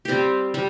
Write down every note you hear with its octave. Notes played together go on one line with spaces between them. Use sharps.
G3 C4 G4
G3